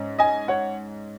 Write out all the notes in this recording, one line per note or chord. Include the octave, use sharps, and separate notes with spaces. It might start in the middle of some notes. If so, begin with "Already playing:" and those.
Already playing: G#2 C#4
D#5 G#5
C#5 F#5